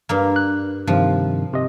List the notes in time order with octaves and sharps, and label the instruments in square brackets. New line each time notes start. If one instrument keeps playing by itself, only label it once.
[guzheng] G2 A#3
[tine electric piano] F#6
[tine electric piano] G2 C3 D#3 [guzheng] F3
[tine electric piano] C3 D#5